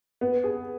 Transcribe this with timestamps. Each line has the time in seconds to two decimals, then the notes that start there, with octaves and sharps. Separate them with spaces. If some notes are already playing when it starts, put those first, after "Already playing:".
0.21 B3
0.44 G#4